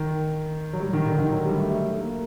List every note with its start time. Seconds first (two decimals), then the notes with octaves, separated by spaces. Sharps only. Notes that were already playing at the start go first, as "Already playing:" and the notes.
Already playing: D#3
0.73 F#3
0.80 G3
0.93 D#3
1.06 D3
1.19 D#3
1.32 F#3
1.44 G3
1.58 A3
1.70 A3
2.00 A#3